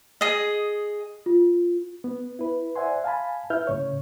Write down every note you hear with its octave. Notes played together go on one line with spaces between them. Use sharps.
G#4 D#5
F4
B3
E4 B4
C5 D5 E5 F#5 G#5 C6
F5 G#5 A5 B5
E4 B4 E5 F6 G6
A2 C#3 C#5